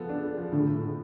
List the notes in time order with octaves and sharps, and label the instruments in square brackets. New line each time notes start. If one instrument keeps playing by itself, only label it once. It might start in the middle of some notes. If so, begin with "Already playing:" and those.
Already playing: [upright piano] F3 B3 A4
D4
A4
F3
[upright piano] A2 [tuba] D3
[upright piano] A2
A2